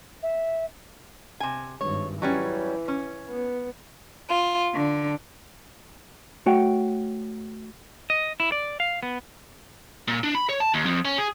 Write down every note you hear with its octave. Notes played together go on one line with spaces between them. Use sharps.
E5
C3 G#5
G#1 G2 C#5
E3 F#3 G3 C#4
C#4
B3
F4
D3
A3 F#4 C#5 F#5 G5
D#5
E4
D5
F5
B3
A#2
D4
B5
C#5
A5
D#2
F2
C#4
G#4